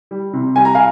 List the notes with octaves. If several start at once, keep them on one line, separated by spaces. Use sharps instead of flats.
G3
C3
G3 G#5
A#5
F5 G#5